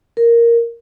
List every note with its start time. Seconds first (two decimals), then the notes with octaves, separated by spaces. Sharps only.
0.17 A#4